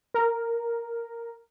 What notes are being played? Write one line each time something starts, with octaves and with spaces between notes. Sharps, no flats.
A#4